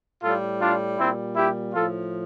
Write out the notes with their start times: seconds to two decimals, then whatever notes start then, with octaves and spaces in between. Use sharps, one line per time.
0.23 A2 G3 F4 A4
0.61 D4 F4
0.98 A#2 G3 C4 E4
1.36 E4 G4
1.73 A2 F3 F4 A4